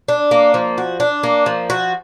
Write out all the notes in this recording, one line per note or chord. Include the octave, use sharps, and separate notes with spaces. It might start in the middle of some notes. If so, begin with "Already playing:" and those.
D4
A#3
F3
F#4
D4
A#3
F3
F#4